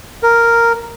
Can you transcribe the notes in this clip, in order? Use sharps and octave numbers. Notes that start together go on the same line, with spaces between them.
A#4